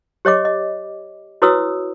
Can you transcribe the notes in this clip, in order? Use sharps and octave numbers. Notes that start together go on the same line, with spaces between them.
G4 C#5 D#5 D6
D#5
E4 F#4 B4 C#5 D#6 E6